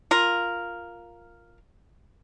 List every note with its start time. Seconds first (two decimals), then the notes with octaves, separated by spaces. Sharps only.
0.11 F4 A#4